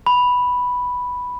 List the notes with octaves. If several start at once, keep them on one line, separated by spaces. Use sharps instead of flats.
B5